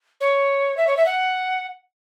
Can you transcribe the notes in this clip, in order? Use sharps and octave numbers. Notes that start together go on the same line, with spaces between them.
C#5
E5
C#5
E5
F#5